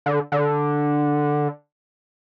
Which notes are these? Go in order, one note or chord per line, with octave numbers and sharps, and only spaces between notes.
D3
D3